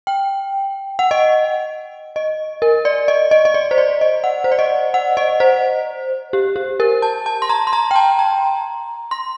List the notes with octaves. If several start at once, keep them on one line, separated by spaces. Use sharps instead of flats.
G5
F#5
D#5
D#5
A#4
D5
D#5
D#5
D#5
D5
C5
D5
D#5
F#5
C5
D5
D#5
F#5
D#5
C5
G4
G4
A#4
A5
A5
C6
A#5
C6
A#5
G5
A5
A#5
C6